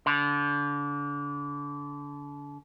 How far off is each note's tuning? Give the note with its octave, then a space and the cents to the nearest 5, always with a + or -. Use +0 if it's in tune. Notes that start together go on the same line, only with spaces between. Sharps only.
D3 -30